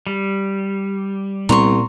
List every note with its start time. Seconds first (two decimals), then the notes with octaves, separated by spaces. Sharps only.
0.07 G3
1.49 C2 A#2 B3 A#5 C6 C#6